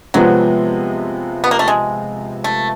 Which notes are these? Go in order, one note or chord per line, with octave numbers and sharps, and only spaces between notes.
C3 F3 F#3 G#3 B3
B3
A#3
A3
G#3
A3